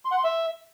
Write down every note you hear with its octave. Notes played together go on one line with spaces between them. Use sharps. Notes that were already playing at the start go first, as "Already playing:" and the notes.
C6
F#5
C6
E5